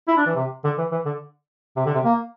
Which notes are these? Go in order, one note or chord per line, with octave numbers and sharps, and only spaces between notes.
E4
D4
E3
C3
D3
E3
E3
D3
C3
D3
C3
A#3